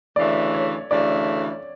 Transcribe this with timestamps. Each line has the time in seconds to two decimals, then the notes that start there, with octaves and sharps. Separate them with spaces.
0.16 D2 C#3 E3 A3 D5
0.54 C#5
0.90 D2 C#3 E3 A3 D5